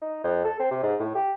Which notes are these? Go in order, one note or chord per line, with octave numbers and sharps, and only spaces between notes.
D#4
F2
A4
C4
C3
G#2
A2
G4